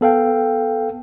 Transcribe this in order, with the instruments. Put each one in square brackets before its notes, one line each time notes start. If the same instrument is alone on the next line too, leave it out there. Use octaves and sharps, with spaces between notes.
[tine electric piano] B3 A4 F5 G5